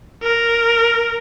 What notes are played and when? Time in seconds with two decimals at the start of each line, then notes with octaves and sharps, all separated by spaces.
0.22 A#4